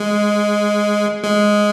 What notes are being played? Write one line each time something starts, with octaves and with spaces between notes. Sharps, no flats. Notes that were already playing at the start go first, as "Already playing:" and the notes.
Already playing: G#3
G#3